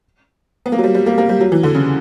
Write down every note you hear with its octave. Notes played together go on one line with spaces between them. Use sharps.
B3
A#3
F#3
G3
G3
A#3
A#3
G3
F#3
E3
D3
C#3